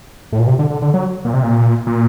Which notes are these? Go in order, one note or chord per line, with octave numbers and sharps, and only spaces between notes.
A2
A#2
C3
D3
D3
D3
F#3
A#2
C3
A#2
A#2